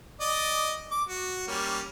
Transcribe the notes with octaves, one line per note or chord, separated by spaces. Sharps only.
D5 D#5
D6
F#4
G3 A#3 C#4